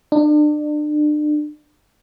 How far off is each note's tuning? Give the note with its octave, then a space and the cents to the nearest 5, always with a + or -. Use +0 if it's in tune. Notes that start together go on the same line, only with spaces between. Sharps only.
D4 +35